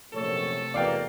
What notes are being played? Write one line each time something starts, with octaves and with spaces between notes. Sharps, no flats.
A#1 F#2 C3 A3 A4 C#5
E2 B2 A#3 D5 F5 G5